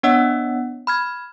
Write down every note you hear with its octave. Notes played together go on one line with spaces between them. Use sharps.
B3 D4 C#5 D#5 F#5 E6
B5 F6 G#6